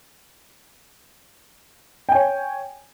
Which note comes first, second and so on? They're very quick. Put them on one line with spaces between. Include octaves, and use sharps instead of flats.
G5 G#5 C#5